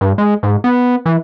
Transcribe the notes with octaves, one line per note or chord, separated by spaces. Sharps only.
G2
G#3
G#2
B3
E3